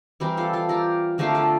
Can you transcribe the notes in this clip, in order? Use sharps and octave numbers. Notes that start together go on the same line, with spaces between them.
E3 G3 C4 G4 A#4
F4 A4
F4 A4
G4 A#4
D3 F3 A3 C4 G4 A#4
F4 A4